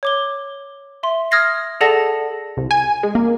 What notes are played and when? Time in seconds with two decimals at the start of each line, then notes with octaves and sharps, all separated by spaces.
0.03 C#5 D6 G7
1.03 E5 C6
1.31 D#6 F6 G#6 A#6 C7
1.81 G#4 A4 D5 F#5 A5 A#6
2.57 C2
2.71 G#5
3.03 G#3
3.15 A#3